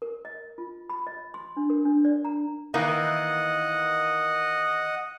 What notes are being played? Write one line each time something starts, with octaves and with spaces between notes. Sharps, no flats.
A#4
D#5
F4
B5
D#5
C6
D4
A#4
D4
D5
A#5
D#3 E3 A#3 D#5 F#5